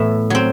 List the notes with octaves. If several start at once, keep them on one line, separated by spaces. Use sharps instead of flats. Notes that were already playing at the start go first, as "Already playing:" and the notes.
Already playing: A2 E3 B3 E5
F#3 C4